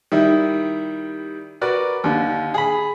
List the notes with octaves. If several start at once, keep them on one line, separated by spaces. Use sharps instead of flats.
D#3 G3 E4
F#4 A#4 B4 D5
D#2 D3
G#4 B5